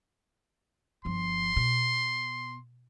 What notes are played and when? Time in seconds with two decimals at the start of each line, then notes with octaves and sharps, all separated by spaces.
1.05 G1 F3 C6
1.56 B2